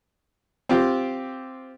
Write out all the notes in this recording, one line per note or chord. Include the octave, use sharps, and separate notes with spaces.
C4 F4 G4